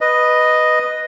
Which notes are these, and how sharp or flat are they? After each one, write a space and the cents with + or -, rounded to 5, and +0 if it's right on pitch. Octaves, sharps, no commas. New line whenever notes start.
B4 +0 D#5 +0